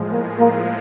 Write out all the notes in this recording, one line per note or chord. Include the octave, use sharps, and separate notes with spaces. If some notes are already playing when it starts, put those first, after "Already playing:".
Already playing: A2 F3 G#3
A#3
A#3